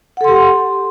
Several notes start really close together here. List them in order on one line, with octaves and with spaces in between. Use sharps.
F#5 A4 C6 G4